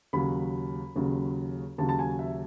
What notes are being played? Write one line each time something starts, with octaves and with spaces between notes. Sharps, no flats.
D#2 C#3 F#3 B5
D#2 C#3 F#3
D#2 C#3 F#3 A5
A5
G#5
E5